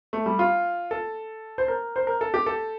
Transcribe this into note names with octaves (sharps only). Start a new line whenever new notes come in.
A3
G3
F4
A4
C5
A#4
C5
A#4
A4
G4
A4